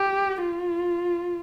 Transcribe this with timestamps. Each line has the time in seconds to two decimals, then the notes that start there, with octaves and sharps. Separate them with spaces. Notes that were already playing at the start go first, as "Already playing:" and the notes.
Already playing: G4
0.41 F4